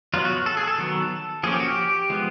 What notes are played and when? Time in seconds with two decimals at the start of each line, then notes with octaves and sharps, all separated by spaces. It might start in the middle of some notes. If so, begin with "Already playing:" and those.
0.14 F#3 B3 F4
0.25 F#4
0.46 A4
0.57 G#4
0.68 A4
0.78 D#3 F#3 B3
1.43 F3 A#3 C#4 G#4
1.52 G4
1.60 F#4
1.69 G4
2.10 F3 G#3 B3